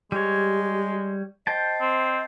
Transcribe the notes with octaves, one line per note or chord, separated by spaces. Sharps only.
G3 G#3 G4 C#5
C5 D#5 G5 A5
C4